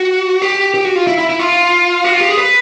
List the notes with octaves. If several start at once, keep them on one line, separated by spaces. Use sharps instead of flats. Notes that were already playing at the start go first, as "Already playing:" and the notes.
Already playing: F#4
G4
G4
F#4
F4
E4
E4
E4
F4
F#4
F4
G4
G#4
B4